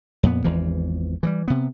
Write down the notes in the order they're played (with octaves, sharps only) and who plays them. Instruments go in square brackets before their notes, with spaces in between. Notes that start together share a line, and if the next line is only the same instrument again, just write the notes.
[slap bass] F2 A#2 B3
G#1 E2 E3 F3
E3 F3 G3
C3 B3